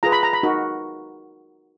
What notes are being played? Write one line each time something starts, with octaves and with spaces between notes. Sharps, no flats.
F4 G#4 B4 A#5
B5
A#5
B5
D#4 F#4 A#4